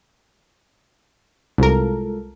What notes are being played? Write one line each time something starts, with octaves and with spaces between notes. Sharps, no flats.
C2 G#3 F4 A4 A#4